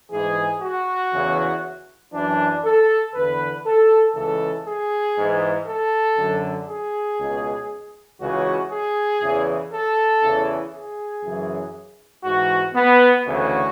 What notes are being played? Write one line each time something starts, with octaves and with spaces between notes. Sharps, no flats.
G#2 E3 G#4
F#4
E2 C#3 E3
F#2 E3 D4
A4
E2 D3 B4
A4
C#2 C#3 E3 A4
G#4
G#2 E3
A4
F#2 D3
G#4
C#2 B2
C#2 C#3 E3 F#4
G#4
E2 C#3 E3
A4
E2 C#3 E3
G#4
F#2 C#3 E3
G#2 E3 F#4
B3
D2 C#3 E3 F#4